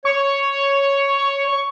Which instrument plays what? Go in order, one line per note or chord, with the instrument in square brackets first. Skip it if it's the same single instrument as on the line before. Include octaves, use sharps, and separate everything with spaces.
[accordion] C#5 [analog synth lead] C#6